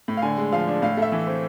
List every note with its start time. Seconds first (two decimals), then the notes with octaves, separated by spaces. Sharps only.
0.08 A2
0.17 F5
0.22 D3 G#5
0.38 G#3
0.52 F3 F5
0.68 D4
0.82 A2 F5
0.97 A3 E5
1.12 E3
1.27 C4